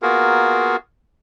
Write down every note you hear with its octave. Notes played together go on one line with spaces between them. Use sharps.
A#3 B3 F4 F#4 G#4 A#4